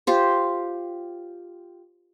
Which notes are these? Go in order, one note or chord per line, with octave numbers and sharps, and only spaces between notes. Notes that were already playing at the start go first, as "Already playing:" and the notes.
F4 G4 C5